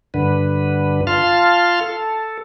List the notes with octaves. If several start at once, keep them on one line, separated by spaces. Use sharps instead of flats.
G2 D3 B4
F4 F5 A5 C6 F6
A4